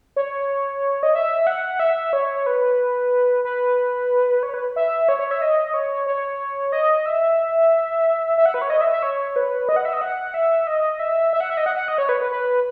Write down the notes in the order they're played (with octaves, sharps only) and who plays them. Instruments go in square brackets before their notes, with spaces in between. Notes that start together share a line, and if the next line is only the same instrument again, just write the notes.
[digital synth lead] C#5
D#5
E5
F#5
E5
C#5
B4
B4
C#5
B4
E5
C#5
C#5
E5
D#5
C#5
C#5
D#5
E5
E5
F#5
B4
C#5
D#5
E5
E5
C#5
B4
D#5
F#5
E5
D#5
F#5
E5
D#5
E5
E5
F#5
E5
D#5
F#5
F#5
D#5
C#5
B4
B4
B4